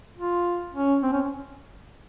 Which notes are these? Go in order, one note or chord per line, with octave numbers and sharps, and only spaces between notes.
F4
C#4
C4
C#4